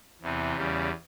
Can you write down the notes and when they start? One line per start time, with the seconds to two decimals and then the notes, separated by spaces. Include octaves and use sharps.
0.22 E2 C3 E3
0.57 E2 C#3 G3